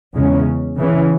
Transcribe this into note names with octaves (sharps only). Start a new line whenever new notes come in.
E2 C#3 G#3 C#4
C#3 E3 C#4